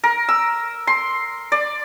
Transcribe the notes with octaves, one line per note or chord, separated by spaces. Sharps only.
A#4
E6
C6
D5